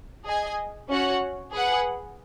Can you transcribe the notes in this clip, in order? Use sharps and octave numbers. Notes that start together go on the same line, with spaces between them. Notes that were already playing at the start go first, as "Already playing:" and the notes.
G#4 D#5 G#5
C#4 F#4 C#5 F#5
G#4 B4 F#5